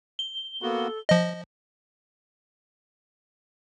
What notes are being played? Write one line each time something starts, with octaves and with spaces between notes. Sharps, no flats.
G7
A#3 B3 F#4 A4
F3 D#5